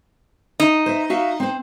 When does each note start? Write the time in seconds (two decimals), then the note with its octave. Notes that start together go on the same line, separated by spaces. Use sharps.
0.60 D#4
0.86 C5 E5
1.10 F#4 E5 F5
1.40 C4 C5